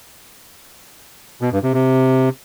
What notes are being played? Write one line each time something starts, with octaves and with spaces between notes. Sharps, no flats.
B2
G2
C3
C3